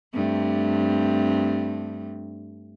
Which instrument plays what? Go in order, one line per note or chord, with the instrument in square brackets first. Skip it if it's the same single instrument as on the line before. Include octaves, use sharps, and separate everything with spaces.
[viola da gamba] G2 A3 C4